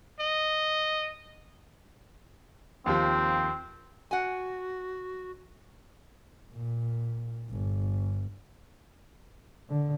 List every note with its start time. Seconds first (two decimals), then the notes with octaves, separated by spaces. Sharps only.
0.20 D#5
2.86 D#2 F3 C4 G4
4.11 F#4 F#5 G#5
6.53 A#2
7.50 G1
9.70 D3